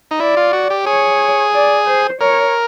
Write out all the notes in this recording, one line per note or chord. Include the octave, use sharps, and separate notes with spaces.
D#4
E4 D5
F4
F#4
G4
G#4 C#5
D5
C5
A#4 C#5